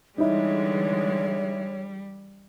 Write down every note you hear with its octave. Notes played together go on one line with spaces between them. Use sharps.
D3 E3 G3 G#3 D#4 E4 C#5